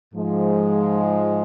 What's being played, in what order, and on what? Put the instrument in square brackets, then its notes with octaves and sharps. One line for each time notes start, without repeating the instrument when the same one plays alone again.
[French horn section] G#2 F3 G#3